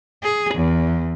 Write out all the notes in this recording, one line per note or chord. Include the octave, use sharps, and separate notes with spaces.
G#4
E2